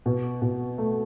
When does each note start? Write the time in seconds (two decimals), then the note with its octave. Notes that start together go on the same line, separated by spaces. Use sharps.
0.06 B2
0.42 B2
0.78 A3